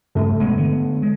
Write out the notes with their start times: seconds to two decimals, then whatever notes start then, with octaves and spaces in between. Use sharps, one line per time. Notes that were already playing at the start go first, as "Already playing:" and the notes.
0.15 G2 C#3 A3
0.40 E1 G#3 B3
0.57 D3 B3
1.02 G#3